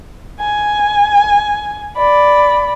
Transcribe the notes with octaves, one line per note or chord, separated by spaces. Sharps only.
G#5
D5 B5